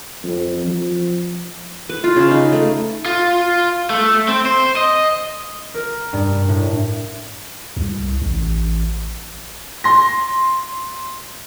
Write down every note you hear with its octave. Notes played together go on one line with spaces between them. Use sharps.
F2
F3
B4
F4
C#3
D#4
A3
F4
A3
C4
C5
D#5
A#4
G2
A2
C2
A1
C6 A#6